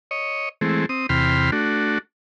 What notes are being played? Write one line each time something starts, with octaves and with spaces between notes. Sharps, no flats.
C#5 D#5
E3 G#3 A3 C4
C4 D#6
E2 C3 G5 B5 C6 F6
A3 D4 F#4